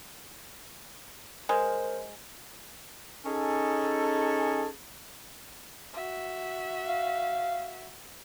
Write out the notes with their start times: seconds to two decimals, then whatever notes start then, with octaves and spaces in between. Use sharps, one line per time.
1.49 G#3 A#4 C5
3.25 C#4 D#4 G#4 A4
5.93 F#4 E5
6.88 F5